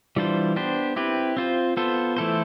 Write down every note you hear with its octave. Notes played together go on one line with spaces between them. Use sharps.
E3 G3 D4 F4 C5
B3 D4 G4 C5
C4 E4 G4 B4
C4 F4 C5
B3 F4 A4 C5
E3 A3 E4 A4 C5